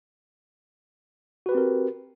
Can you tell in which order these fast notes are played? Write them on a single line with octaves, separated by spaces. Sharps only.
F#4 B4 G4 C4 A#4